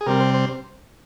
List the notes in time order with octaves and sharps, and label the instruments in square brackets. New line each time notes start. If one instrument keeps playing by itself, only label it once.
[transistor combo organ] G#4
C3 G3 C4 A#4
C5
C5